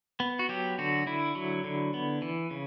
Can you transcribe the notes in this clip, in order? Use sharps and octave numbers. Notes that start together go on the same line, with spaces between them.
B3
F#4
F#3 G4
D3 F#4
D3 E4
F#3
D3
B3
E3
C#3